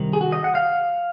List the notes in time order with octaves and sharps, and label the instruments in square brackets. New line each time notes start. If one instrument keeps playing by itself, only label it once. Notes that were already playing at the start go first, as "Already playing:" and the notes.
Already playing: [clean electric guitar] C2 C3 D#3
G#4
F#4
D#5
F#5
F5